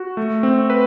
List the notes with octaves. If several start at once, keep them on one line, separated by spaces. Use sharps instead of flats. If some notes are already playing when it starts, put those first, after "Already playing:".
Already playing: F#4
A3
C4
B4